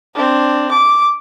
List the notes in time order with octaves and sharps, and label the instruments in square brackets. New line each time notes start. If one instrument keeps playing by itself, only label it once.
[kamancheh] C4 D4
D6